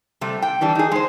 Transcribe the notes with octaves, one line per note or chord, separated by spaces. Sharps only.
C3 G3 A3
G5
E3 G3 D4
D#4 G#4
G#3 C5